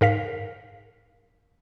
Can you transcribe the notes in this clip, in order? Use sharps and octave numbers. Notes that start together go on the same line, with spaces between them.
G#2 A#4 F5 B6